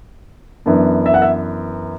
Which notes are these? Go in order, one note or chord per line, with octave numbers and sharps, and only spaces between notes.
F#2 E3 B3 D4
E5
F#5
E5